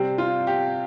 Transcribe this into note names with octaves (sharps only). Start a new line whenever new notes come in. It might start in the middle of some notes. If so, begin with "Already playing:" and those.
Already playing: C3 G3 C4
F4
G4